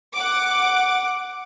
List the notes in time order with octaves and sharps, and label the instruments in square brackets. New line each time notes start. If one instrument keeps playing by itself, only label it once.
[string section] F#5 D6